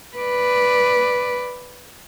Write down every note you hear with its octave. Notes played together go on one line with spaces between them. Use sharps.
B4 D5